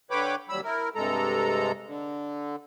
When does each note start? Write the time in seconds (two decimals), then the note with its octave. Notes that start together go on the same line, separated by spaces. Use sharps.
0.11 D3 B4 C#5 G5 B5 D6
0.49 D#2 F#3 G3 B5 E6
0.64 E4 A#4
0.96 G2 C3 G#3 A4 A#5
1.86 D3